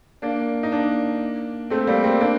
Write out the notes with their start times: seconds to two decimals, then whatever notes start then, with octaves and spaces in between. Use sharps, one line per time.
0.22 A#3 D4
0.63 D#4
0.72 A#3 D4
1.70 A3 C4
1.87 G3 A#3
2.04 A3 C4
2.20 A#3 D4